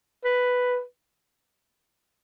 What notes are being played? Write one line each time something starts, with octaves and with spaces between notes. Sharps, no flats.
B4